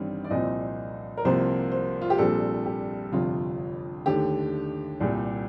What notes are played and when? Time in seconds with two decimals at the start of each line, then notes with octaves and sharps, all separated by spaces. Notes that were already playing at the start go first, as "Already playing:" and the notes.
Already playing: A1 G2 D#3 G3 C4
0.24 D5
0.30 C2 A#2 F3 C4 D#5
1.17 A#4
1.25 C2 C3 F3 A#3 C5
1.72 C5
2.02 F4
2.10 G4
2.18 A#1 A#2 G3 C4 A4
2.66 G4
3.12 G1 F2 C3 F4
4.06 D#2 D3 A3 G4
5.00 C2 A#2 G3